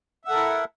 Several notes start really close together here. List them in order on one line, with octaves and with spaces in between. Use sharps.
E5 F#5 A4 A#4 E4